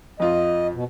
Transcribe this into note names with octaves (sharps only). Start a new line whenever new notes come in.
F2 F4 D#5
B2